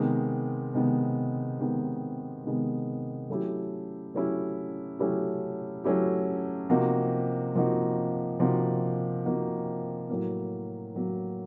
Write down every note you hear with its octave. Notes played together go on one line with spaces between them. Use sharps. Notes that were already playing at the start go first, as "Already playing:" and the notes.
Already playing: C3 D#3 G#3 B3
C3 D#3 G#3 B3
C3 D#3 G#3 B3
C3 D#3 G#3 B3
F#3 A3 C#4 E4 G4
F#3 A3 C#4 E4 G4
F#3 A3 C#4 E4 G4
F#3 A3 C#4 E4 G4
C3 F3 A#3 D#4 F#4
C3 F3 A#3 D#4 F#4
C3 F3 A#3 D#4 F#4
C3 F3 A#3 D#4 F#4
A2 F#3 A#3
A2 F#3 A#3